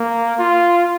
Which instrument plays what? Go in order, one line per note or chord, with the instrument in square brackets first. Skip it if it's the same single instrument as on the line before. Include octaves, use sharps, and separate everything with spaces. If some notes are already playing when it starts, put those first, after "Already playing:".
Already playing: [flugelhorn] A#3
F4